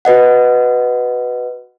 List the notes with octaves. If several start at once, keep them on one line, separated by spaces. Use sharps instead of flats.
F#4 B4 D#5 F#5